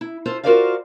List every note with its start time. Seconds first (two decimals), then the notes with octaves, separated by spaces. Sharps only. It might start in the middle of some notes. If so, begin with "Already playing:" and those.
0.01 E4
0.26 F4 A4 C5
0.44 F4 F#4 A#4 C5 D5 F5